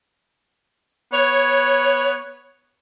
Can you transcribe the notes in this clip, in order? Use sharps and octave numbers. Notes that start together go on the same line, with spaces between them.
B3 C#5